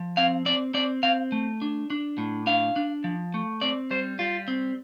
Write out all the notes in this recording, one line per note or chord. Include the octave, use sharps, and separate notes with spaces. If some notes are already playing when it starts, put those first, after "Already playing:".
Already playing: F3
C4 F5
C4 D5
C4 D5
C4 F5
A3
D4
D4
A2
D4 F5
D4
F3
A3
C4 D5
G3 C5
G3 F4
C4